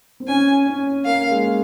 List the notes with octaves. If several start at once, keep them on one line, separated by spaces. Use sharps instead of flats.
C4
C#4 G#5
C#4
A#3 F5
G#3